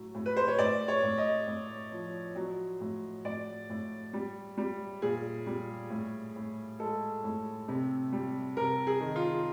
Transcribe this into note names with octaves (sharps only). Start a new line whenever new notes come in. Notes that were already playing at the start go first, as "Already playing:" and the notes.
Already playing: A2 F#3
A2
B4
C5
C#5
A2 D5
C#5
A2
D#5
A2
F3
F#3
A2
A2 D5
A2
G3
G3
A#2 G#4
G3
A2
A2
G#3 A4
A2
C3
G3
C3 A#4
G#4
D#3
F4